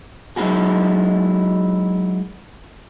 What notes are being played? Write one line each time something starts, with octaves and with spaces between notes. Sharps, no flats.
F#3 G#3 D#4 E4 F#4 G#4